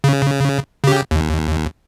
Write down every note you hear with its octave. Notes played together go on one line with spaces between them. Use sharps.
C#3
C#3 G4
D#2